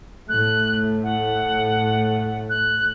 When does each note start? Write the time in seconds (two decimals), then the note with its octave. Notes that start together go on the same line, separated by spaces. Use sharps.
0.29 A2 A3 F#6
1.03 F#5
2.50 F#6